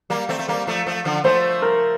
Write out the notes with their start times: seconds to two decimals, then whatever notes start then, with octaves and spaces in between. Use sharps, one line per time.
0.10 G3 A#3
0.29 A3 C4
0.39 A3
0.48 G3 A#3
0.67 F3 A3
0.87 F3 A3
1.05 D3 F3
1.24 F3 A3 C5
1.62 A#4